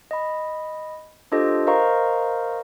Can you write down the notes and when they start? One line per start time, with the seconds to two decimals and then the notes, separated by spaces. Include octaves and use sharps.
0.11 D#5 B5
1.32 D4 F4 G4 A4 C5 D#5
1.67 A#4 C5 D#5 F5 A#5 C#6